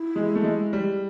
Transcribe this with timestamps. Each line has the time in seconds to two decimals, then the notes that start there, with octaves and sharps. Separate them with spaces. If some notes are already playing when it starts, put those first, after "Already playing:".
Already playing: E4
0.16 G#3
0.36 A3
0.44 G#3
0.73 G3